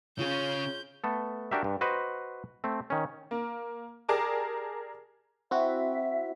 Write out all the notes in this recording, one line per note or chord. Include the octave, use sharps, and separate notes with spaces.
C#3 C#4 F4 G#4 C#5 G6
A3 B3 A4
D4 F#4 G4 A#4 E5
G2
F#4 B4 C5 D#5
A3 C4
D#3 C#4
A#3
G4 G#4 A#4 D5 A5 D6
C4 E4 F#4 E5